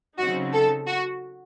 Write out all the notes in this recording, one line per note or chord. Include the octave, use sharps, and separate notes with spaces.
C#3 F#3 C4 D#4 F#4
A4
F#4